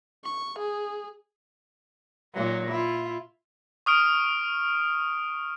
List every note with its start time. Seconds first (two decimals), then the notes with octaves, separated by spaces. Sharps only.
0.24 C#6
0.58 G#4
2.34 A#2 D#3 F#3
2.70 E4 F4
3.86 C#6 D#6 F6 D7